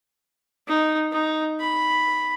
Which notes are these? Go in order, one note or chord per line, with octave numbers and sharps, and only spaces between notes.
D#4
D#4
B5